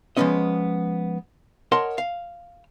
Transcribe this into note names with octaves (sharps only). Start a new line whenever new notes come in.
F3 G#3 A#3 B3 C#4 D#5
A#4 C#5 D#5 F#5 A5 C6
F5